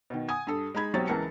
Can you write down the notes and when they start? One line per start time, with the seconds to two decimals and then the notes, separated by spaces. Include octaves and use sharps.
0.10 B2 D#3
0.29 F#5 G#5 D#6 G#6
0.47 G2 A4
0.75 G#3 D#4 B5 G#6
0.94 B1 F#3 C4 G4 C#5 A6
1.07 C#2 E3 A#4 A5 C#7